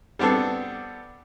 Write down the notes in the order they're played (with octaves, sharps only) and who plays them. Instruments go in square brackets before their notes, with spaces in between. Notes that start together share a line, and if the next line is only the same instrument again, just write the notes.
[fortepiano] G3 B3 C4 D4 A4